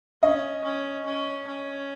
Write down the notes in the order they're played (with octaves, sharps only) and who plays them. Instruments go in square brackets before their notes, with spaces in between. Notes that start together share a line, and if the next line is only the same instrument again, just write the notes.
[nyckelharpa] C#4 [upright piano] D#5
[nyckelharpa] C#4
C#4
C#4